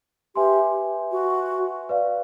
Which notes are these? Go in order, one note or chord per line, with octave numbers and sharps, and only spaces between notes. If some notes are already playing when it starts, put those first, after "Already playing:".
G4 B4 E5 G#5 C6
F#4
B4 D5 F5